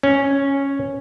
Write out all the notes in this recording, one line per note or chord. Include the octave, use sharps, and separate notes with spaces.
C#4